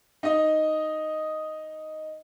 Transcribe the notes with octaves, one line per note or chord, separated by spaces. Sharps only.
D#4 D#5